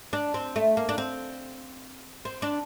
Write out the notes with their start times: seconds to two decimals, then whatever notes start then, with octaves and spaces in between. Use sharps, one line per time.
0.13 D4
0.34 C4
0.56 A3
0.77 A#3
0.89 D4
0.98 C4
2.25 C4
2.42 D4